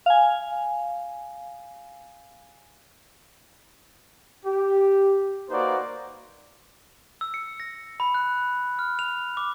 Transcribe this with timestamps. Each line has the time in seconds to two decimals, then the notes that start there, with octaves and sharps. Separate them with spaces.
0.06 F5 G#5
4.46 G4
5.50 A#3 D#4 F#4 B4 C5 D5
7.21 E6
7.34 C#7
7.60 A#6
8.00 B5
8.14 F#6
8.79 F6
8.99 F7
9.37 D6